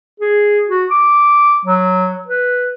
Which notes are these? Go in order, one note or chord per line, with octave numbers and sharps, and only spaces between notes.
G#4
F#4
D6
F#3
B4